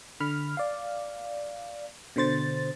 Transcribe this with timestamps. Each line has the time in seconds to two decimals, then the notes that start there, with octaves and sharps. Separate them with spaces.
0.20 D3 B5 F6
0.57 D5 F5
2.16 B2 D3 C5 A6